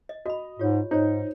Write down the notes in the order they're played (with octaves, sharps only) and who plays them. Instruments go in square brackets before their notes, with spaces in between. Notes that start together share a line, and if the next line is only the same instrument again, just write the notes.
[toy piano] D#5
[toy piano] F#4 B5 [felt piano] D#5
[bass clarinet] G#2 [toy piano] F4 G4 C#5
[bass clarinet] G#2 [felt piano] D#4 [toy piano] C5 C#5